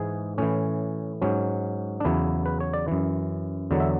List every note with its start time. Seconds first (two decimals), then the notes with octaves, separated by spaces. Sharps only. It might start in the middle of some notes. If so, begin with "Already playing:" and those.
Already playing: G#2 E3 G#4
0.38 A2 E3 C#4
1.21 G#2 F#3 C#4
2.00 D4
2.05 E2 C#3 F#3 E4
2.46 B4
2.60 C#5
2.73 D5
2.88 F#2 E3
3.71 E2 D3 F#3
3.80 E5